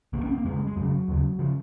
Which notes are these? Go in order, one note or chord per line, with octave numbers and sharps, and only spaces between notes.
C2 C3 A#3
C#4
C4
A#3
F2 C#3 G#3
G#3
F2 C#3 F#3
D#2 C#3
C#3 F3